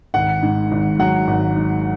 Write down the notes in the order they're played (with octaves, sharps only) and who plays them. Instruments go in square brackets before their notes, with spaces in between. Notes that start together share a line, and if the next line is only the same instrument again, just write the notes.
[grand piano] G#1 F#5
G#2
G#1
F#3 F#5
G#1
G#2